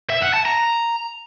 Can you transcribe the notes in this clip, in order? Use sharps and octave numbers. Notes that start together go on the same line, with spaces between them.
E5
F#5
A5
A#5